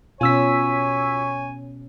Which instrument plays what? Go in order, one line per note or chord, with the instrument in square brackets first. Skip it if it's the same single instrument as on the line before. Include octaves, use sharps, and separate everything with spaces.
[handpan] B2 C#4 [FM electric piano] F4 E6 B6 [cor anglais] C#5 [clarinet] G#5